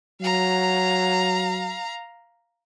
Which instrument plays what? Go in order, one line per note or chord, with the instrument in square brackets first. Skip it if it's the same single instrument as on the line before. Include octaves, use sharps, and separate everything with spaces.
[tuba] F#3 [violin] F5 A#5